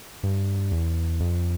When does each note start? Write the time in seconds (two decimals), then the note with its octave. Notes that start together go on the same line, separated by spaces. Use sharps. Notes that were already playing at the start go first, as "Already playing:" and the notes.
0.24 G2
0.71 E2
1.20 F2